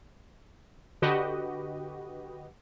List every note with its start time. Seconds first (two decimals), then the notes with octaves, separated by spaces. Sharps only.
1.02 D3 F#4 G4 B4 D#5